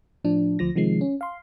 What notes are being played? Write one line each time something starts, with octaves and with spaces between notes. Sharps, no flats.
A2 F3 D4
D2 F3 A#6
C3 D#3 F3 G#3 C7
C#4
F5 C6